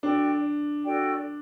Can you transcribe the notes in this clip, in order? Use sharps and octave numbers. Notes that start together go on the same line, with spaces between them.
D4 F#4 A4 D5 G5
F#4 A4 D5 G5